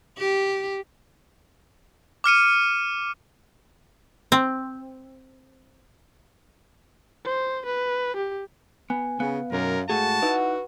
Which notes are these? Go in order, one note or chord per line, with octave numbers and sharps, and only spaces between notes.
G4
D6 F6 C#7 D#7
C4
C5
B4
G4
B3 G#5
C#3 B3 F5
B1 F#2 A#4
G#2 A3 F#4 G#4 A5
D#4 E4 B4 F#5